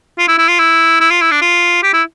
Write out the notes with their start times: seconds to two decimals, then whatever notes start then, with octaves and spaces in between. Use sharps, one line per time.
0.18 F4
0.28 E4
0.38 E4
0.48 F4
0.59 E4
1.00 E4
1.11 F4
1.21 E4
1.31 D4
1.42 F4
1.83 G4
1.93 E4